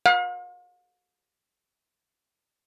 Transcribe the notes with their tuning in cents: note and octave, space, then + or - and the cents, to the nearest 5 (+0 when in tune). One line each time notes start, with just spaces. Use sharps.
F5 +45